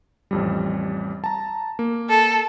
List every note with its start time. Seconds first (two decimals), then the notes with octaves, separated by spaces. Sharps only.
0.31 A1 F2 G3
1.24 A5 A#5
1.79 A#3
2.10 A4